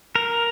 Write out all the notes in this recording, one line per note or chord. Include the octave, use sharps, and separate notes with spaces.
A#4